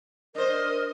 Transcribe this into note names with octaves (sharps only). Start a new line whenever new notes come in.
D4 A#4 C5 D#5